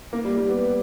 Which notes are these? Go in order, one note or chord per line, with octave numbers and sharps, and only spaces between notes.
A#3
G3
G3
B3